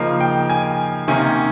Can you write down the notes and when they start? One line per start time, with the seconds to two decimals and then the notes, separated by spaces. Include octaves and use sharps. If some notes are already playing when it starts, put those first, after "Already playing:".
Already playing: C#3 F3 A#3 D#4
0.20 G5
0.50 G#5
1.08 C3 D#3 A#3 C#4 G#5